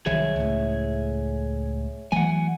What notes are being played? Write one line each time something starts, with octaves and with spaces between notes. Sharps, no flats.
C2 D#3 F#3 G#4 C#5 E5
C#2 A2
E3 F#3 A3 F#5 G#5